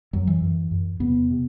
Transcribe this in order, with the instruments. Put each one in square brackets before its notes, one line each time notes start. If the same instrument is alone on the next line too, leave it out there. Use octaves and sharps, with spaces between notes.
[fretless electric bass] F#2 F#3
E3
F#2
F#2
E2 C3 B3
C3